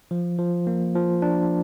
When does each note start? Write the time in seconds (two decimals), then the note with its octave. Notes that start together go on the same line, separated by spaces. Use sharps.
0.11 F3
0.39 F3
0.67 A#3
0.95 F3
1.22 D4